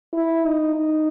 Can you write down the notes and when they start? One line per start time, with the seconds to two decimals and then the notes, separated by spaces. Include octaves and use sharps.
0.14 E4
0.45 D#4
0.76 D#4